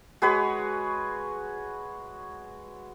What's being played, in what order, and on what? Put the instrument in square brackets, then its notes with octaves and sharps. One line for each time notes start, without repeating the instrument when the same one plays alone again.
[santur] G#3 F#4 B4 C#5